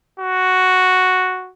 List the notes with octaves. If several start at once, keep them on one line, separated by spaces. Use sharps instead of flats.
F#4